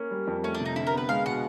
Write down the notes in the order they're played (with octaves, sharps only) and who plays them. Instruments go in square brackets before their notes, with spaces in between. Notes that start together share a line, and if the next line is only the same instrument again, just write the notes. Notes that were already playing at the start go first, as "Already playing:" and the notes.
Already playing: [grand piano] A#3 [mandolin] C#4
[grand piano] G3
F2
[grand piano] A3 [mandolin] C#4
[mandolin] D4
[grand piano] C3
[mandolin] D#4
[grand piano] D3 [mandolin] E4
[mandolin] A#4
[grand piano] B3
[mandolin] B4
[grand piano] G#3 [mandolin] F5
[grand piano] B2 [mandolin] F#5